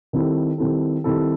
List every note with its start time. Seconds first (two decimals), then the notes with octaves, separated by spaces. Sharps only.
0.13 D#3 G3 C4 E4 A4
0.58 D#3 G3 C4 E4 A4
1.04 D#3 G3 C4 E4 A4